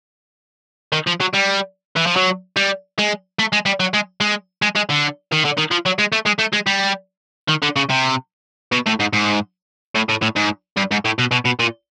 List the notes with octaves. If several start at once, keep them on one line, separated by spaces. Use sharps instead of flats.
D#3
F3
F#3
G3
E3
F3
F#3
G3
G#3
A3
G#3
G3
F#3
G#3
G#3
G#3
G#3
D3
D#3
D3
D#3
F3
F#3
G#3
A3
G#3
A3
G#3
G3
D#3
D3
C#3
C3
B2
A2
G#2
G#2
A2
A2
A2
G#2
G2
G#2
A2
B2
B2
B2
A#2